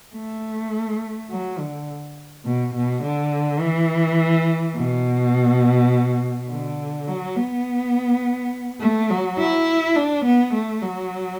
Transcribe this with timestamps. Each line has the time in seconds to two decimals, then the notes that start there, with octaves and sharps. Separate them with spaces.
0.15 A3
1.30 F#3
1.59 D3
2.45 B2
2.74 B2
3.03 D3
3.61 E3
4.76 B2
6.50 D3
7.08 F#3
7.36 B3
8.80 A3
9.10 F#3
9.39 E4
9.96 D4
10.25 B3
10.54 A3
10.83 F#3